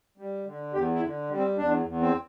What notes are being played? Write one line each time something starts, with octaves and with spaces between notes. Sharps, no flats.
G3
D3
E2 G4
E4
D3
G3
C4
E2 D4
E2
C4